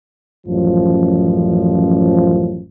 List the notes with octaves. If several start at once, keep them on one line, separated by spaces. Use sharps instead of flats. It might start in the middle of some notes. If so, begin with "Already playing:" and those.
A1 F#2 F3